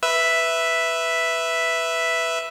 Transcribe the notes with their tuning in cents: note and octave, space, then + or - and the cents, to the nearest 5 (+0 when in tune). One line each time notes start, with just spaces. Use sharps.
B4 +0 E5 +0